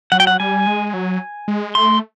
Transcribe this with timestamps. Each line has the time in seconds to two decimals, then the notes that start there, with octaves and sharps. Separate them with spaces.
0.12 F#3 F#5
0.20 G5
0.27 F#5
0.40 G3 G#5
0.67 G#3
0.94 F#3
1.48 G#3
1.75 A3 C6